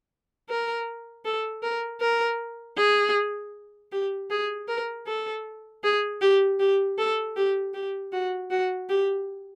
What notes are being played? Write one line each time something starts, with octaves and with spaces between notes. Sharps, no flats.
A#4
A4
A#4
A#4
G#4
G4
G#4
A#4
A4
G#4
G4
G4
A4
G4
G4
F#4
F#4
G4